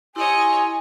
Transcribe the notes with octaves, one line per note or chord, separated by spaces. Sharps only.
E4 G4 C#5 D#5 G#5 C6